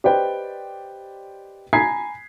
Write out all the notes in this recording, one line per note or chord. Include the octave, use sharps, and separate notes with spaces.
G4 B4 C5 D5 D#5 G5
G#5 A#5 B5 G#6 B6 C7